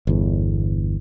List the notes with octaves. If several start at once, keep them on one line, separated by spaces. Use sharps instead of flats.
G1 E2